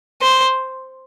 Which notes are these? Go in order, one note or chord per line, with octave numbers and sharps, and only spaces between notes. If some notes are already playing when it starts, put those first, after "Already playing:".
C5